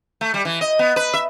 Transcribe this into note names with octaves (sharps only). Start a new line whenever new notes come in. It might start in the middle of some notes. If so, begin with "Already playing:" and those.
A3
G3
E3
D#5
B3
B4
E5